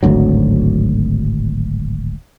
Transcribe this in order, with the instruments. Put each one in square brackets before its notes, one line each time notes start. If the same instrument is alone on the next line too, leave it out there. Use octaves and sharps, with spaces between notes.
[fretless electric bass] D1 G#1 D2 F#3